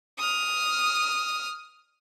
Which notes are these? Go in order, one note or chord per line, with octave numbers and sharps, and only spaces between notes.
D#6 F6